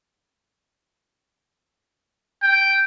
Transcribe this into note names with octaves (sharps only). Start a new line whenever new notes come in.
G5